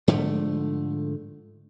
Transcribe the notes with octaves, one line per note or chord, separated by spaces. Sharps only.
G#2 D3 F3 A3